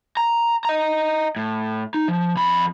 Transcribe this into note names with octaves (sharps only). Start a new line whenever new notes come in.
A#5
D#5 A#5
A2
D#4
F3
F2 B5